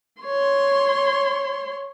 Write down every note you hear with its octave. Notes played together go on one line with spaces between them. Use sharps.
C#5 C6